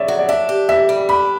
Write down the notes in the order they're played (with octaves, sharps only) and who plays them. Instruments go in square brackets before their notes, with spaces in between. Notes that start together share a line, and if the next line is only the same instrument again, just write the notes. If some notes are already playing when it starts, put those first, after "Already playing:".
Already playing: [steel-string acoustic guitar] C#3 [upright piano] C#5 D5 E5
[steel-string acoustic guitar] F#3
[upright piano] D5
[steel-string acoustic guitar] D4 [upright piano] E5
[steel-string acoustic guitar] G4
[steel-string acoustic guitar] E3 [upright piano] E5
[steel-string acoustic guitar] G3
[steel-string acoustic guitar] D4 [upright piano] B5